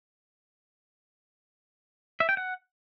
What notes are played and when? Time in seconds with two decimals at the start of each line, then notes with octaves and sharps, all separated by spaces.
2.20 E5
2.29 G5
2.37 F#5